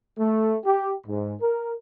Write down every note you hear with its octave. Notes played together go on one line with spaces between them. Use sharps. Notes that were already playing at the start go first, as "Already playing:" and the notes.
A3
G4
G#2
A#4